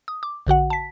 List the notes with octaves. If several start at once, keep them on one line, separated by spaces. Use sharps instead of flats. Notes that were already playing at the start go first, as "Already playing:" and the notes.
D#6
D6
A#1 D3 F#4 F#5
A5 B6